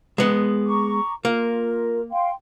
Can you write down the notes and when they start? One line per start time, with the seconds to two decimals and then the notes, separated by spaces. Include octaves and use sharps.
0.18 G#3 B3
0.66 A#5 C#6 D6
1.25 A#3 F4 A#4
2.11 F5 G5 C6